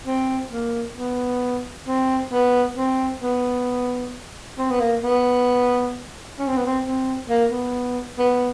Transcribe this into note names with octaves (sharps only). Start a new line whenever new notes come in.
C4
A#3
B3
C4
B3
C4
B3
C4
B3
A#3
B3
C#4
C4
B3
C4
C4
A#3
B3
B3